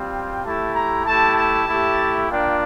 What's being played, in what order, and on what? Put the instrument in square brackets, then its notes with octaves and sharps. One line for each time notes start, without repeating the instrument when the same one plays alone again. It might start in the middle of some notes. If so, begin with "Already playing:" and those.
Already playing: [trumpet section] G3 C4 F4
G5
A3 E4 G4 A5
A#5
A3 E4 G4 A5
A5
A3 E4 G4
A#3 D4 F4 G5